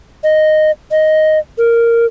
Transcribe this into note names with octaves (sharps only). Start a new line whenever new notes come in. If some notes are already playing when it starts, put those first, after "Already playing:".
D#5
D#5
A#4